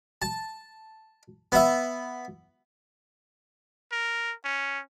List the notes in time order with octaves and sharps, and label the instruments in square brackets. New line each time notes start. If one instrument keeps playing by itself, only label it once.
[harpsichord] A5
B3 E5
[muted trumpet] A#4
C#4